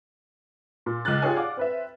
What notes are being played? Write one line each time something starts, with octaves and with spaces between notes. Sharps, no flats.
A#2
C#2 D6 F6 F#6 A6
F4 G4 G#4 C#5 G#5
D5 F5 F#5 D6
C4 B4 E5